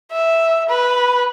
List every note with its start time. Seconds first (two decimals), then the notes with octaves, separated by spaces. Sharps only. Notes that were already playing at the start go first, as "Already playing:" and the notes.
0.11 E5
0.69 B4